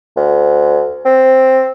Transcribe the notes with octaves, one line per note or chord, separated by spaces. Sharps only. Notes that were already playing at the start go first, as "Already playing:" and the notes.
D2
C4